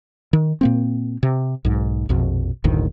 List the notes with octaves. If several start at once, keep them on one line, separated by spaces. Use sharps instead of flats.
D#3
A#2 A#3 C4
C3
B1 G#2
A#1 F2 B2
F#1 D2 A2 D#3